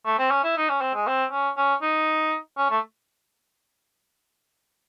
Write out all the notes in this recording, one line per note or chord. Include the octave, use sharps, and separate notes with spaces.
A3
C4
C#4
E4
D#4
C#4
C4
G#3
C4
C#4
C#4
D#4
C#4
A3